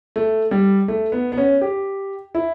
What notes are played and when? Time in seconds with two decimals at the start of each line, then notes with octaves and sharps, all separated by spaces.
0.16 A3
0.51 G3
0.88 A3
1.12 B3
1.32 B3
1.37 C#4
1.61 G4
2.35 E4